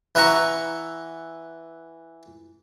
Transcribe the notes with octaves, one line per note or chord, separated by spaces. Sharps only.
E3 B4 E5 F#5 A#5 C#6